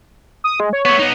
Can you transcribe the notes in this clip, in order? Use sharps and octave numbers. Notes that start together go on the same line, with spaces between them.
D#6
G#3
C#5
A3 B3 C#5
B3 D#4